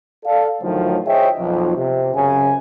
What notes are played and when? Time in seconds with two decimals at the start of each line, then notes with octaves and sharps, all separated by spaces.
0.25 A4 D5 F5
0.62 D2 A2 D#3 F3 F#3
1.06 G#4 C5 C#5 D#5 E5 G5
1.38 B1 F2 F3
1.76 C3
2.15 F#2 C#3 G#5